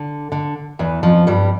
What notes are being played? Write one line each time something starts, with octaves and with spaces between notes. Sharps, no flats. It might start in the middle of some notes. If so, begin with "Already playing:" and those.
Already playing: D3
D3
E2 E3
F2 F3
G2 G3